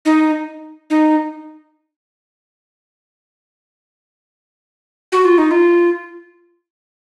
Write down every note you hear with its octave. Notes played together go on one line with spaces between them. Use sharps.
D#4
D#4
F#4
F4
D#4
F4